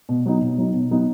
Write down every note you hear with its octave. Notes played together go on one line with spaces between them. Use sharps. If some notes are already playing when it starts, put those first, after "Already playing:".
B2
F#3 B3 D#4
B2
F#3 B3 D#4
B2
F#3 B3 D#4